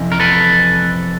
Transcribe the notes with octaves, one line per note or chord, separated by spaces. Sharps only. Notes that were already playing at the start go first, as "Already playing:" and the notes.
Already playing: F2 C3 E3
A#4
A4 B4